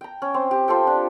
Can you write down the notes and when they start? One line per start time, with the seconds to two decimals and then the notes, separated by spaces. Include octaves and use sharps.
0.01 G5 A#5
0.22 C#4
0.34 C4
0.51 G4
0.68 C4 F4 A4 G5
0.87 D4